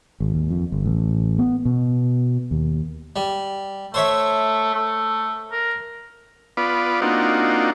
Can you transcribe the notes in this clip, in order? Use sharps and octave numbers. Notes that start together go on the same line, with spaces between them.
G#1
D#2
F2
G1
A1
B3
B2
D#2
G3
A3 C5 C#5 E5
A3
A#4
B3 F4 B4 D5
A#3 C4 D4 D#4 F4 F#4